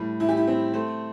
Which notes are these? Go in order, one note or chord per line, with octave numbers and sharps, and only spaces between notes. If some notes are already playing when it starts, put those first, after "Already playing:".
Already playing: A2 G3
A2 E4
G4
E4
C4
A3 C5